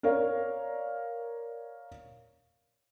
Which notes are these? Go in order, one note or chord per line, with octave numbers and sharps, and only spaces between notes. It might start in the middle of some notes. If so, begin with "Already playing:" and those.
A#4 C#5 D5 F5